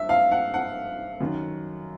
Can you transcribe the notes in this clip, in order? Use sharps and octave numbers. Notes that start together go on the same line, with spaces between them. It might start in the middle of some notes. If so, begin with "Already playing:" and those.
Already playing: G2 E5
F5
F#5
F#5
F#2 D#3